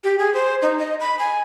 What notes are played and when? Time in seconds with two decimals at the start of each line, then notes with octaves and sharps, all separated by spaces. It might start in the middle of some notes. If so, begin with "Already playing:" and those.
0.04 G4
0.19 G#4
0.34 C5
0.62 D#4
0.79 D#5
1.00 B5
1.19 G#5